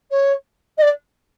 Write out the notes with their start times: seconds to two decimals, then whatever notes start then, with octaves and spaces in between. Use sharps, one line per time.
0.10 C#5
0.77 D#5
0.82 D5